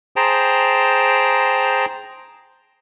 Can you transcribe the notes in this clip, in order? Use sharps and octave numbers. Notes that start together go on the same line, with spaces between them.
G#4 C5 G5 A5 A#5